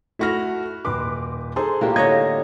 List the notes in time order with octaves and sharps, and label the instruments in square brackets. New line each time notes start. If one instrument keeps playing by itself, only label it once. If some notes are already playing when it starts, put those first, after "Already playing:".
[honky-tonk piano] A3 A#6 [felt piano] E4 F#4 F6
[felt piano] D#1 B4 [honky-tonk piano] C6 D6
[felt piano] G#4 A4 [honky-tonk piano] C5 A#5 C6
[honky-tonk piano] A2 F4 [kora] A#3 D4 G4
[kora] D3 C#5 D#5 [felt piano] G#6 A#6